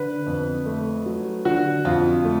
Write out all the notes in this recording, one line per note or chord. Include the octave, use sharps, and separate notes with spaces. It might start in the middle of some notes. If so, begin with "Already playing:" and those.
Already playing: D3 B4
F2
A3
F#3
D3 F#4
F2 F4
A3